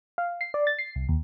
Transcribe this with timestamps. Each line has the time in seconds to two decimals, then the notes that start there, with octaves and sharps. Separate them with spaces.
0.18 F5
0.41 C7
0.54 D5
0.67 A6
0.79 C7
0.96 C2
1.09 D#2